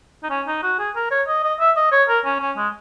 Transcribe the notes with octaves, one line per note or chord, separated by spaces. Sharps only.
D#4
C#4
D#4
F#4
G#4
A#4
C#5
D#5
D#5
E5
D#5
C#5
A#4
C#4
C#4
G#3